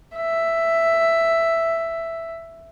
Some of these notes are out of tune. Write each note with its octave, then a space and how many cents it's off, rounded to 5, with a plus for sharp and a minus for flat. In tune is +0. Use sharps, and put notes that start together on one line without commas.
E5 +5